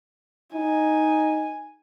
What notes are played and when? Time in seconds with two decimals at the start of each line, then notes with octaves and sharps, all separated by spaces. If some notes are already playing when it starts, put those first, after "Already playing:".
0.55 D#4 G#5